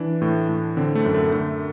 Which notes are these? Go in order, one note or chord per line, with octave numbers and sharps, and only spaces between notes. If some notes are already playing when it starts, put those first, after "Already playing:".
Already playing: E3 D4
A2
A2
D3 C4
A3
F#2
A3
D3 A3